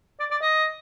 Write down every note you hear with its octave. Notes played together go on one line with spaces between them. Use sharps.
D5
D5
D#5